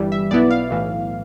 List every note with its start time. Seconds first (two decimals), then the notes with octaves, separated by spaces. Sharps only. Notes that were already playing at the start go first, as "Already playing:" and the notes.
Already playing: G1 G2 E3 G3
0.12 E5
0.31 B1 B2 B3 E4 D5
0.51 F5
0.71 B1 A2 E3